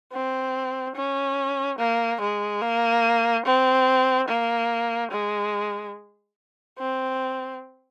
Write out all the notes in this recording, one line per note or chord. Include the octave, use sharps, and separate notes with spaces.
C4
C#4
A#3
G#3
A#3
C4
A#3
G#3
C4